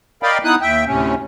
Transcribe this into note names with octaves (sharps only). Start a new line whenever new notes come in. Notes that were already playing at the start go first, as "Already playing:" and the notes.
A#4 D5 D#5 F5 G5 B5
B3 D#4 E4 D#6 F#6
D#2 E5 G5
D2 A2 C3 C#4